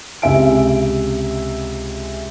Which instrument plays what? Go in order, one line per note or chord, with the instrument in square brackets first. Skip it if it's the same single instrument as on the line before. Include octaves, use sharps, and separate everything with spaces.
[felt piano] C#2 C3 G4 E5 G#5 D7